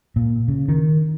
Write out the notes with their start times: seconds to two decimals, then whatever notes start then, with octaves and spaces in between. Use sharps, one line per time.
0.16 A#2
0.48 C#3
0.68 D#3